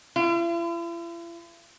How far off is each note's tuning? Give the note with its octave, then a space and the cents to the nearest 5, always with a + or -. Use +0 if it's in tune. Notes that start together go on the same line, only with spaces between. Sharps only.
E4 +45